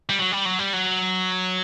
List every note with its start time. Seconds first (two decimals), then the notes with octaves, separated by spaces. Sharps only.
0.09 G3
0.19 F#3
0.32 G3
0.45 F#3
0.59 G3
0.73 F#3